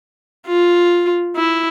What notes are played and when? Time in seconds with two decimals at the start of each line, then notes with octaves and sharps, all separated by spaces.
0.47 F4
1.36 E4